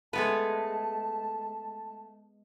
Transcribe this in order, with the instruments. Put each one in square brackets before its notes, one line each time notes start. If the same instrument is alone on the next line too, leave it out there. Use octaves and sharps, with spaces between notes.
[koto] G#3 B3 B4 [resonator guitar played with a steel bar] A3 A4 [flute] A5